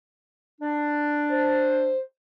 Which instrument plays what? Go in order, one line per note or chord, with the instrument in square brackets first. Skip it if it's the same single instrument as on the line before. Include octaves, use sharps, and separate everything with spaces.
[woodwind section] D4
[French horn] C5